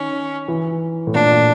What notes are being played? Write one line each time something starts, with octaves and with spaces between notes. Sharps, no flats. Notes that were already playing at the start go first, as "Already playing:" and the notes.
Already playing: D#3 C#4
E3
A2
A#2 D4
A#2